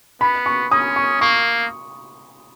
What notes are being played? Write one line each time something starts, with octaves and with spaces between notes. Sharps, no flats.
B3 B5
C#6
C#4 D#6
C#6
A#3 C#6